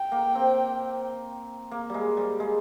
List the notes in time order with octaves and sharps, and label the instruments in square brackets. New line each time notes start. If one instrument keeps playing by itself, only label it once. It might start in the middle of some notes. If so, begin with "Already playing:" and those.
Already playing: [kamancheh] G5
[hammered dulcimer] A#3
C4
A#3
G3 G#3
G3
G#3